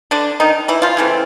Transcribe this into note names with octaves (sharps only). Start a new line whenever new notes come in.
D3 D4
D#3 D#4
E3 E4
F3 F4
C#3 E3 A3 C4